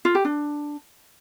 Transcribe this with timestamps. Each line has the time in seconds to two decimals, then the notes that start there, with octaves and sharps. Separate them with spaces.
0.05 F4
0.15 G4
0.25 D4